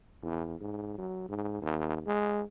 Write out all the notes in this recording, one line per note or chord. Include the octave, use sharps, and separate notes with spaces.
E2
G#2
F#3
G#2
D#2
G#3